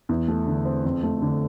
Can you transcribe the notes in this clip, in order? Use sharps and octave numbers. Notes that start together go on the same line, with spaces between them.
E2
A3
D3
C4
F2
A3
D3